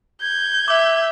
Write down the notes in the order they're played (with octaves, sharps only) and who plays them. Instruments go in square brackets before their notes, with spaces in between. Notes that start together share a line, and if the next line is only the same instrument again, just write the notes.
[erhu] G6 [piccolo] G#6
[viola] E5 [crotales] D6 E6